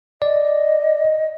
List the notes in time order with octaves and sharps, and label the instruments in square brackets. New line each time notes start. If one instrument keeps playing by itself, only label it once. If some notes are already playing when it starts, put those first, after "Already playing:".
[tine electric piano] D5 [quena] D#5